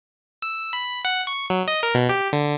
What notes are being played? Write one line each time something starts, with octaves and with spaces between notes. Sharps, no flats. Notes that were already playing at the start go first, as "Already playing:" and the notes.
E6
B5
F#5
C#6
F#3
D#5
A#4
B2
G4
D3